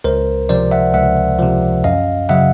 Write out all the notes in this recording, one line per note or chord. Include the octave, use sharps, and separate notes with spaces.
C#2 A#4 C5
C3 F3 C5 D5
E5 F#5
C#2 E5 F#5
C3 F3
F#2 D#5 F5
C#3 F#3 E5 F#5